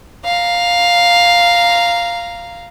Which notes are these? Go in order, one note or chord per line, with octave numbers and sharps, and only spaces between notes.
F5 A#5